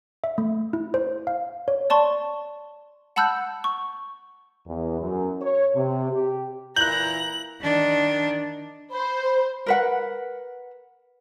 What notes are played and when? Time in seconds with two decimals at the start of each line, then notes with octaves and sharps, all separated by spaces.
0.24 E5
0.38 A3
0.73 E4
0.94 C5
1.27 F5
1.68 C#5
1.90 D5 A5 C6 C#6
3.16 F#5 A5 B5 E6 F#6 G6
3.64 C#6
4.67 E2
5.00 F#2
5.42 C#5
5.75 C3
6.12 G4
6.76 A#2 E3 E4 A#5 F#6 G6 F#7
7.61 D#3 D4
8.91 C5 B5
9.66 A#4 B4 F#5